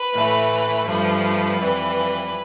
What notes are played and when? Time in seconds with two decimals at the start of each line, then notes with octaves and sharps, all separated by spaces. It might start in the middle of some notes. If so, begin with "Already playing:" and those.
Already playing: B4
0.14 A2 E3 A3
0.86 G2 F3 A3 B4
1.58 F2 E3 G3